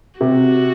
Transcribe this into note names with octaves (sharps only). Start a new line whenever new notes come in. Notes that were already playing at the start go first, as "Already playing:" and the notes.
C3 F#4